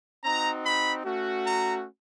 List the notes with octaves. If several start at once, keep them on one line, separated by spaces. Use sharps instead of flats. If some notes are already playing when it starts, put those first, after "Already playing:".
C4 D#4 F#4 A#5
B5
A3 C#4 F#4
A#5